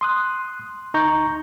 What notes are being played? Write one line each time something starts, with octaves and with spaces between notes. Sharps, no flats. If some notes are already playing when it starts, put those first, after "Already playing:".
C6 D#6 F#6
D2 D#4 A#5 C#6 G6